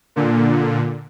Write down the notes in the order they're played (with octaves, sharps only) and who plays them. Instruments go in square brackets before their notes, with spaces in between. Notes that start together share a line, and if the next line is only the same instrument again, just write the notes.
[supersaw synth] A#2 D3